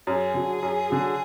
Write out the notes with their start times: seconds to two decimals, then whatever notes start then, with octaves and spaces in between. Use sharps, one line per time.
0.07 F#2 G#4
0.34 D3 F#3
0.63 F#2
0.90 D3 F#3